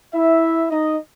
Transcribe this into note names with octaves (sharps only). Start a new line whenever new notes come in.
E4 E5
D#4 D#5